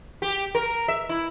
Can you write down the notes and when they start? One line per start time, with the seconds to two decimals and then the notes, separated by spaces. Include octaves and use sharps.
0.22 G4
0.55 A#4
0.88 E5
1.09 E4